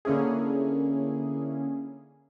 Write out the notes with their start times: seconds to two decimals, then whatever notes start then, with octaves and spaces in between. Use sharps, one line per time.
0.05 D3 A#3 C#4 E4 G#4